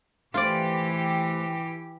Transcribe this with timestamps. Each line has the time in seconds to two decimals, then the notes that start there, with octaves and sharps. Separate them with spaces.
0.34 E3 A3 F4 G4 C5 D5